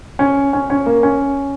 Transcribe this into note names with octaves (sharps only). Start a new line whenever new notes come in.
C#4
C#4
C#4
A#3
C#4